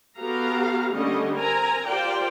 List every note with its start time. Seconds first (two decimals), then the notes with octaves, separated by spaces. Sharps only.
0.19 B3 F#4 G4 A4 F5 A#5
0.93 D3 G3 A3 A#3 C#4 D#5
1.34 C4 A#4 G#5 A#5
1.88 F4 G4 A#4 C5 D5 G5